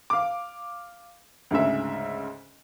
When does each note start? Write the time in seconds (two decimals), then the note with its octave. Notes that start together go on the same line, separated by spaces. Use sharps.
0.10 F5 D6
1.51 D2 G#2 C#3 E5